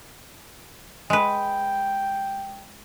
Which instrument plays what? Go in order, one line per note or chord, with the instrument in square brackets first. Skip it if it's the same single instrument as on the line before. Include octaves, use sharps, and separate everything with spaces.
[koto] G#3 B4 [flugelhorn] G5